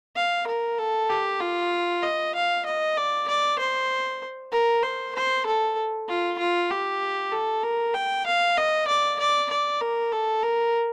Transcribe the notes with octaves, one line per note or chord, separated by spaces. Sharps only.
F5
A#4
A4
G4
F4
D#5
F5
D#5
D5
D5
C5
A#4
C5
C5
A4
F4
F4
G4
A4
A#4
G5
F5
D#5
D5
D5
D5
A#4
A4
A#4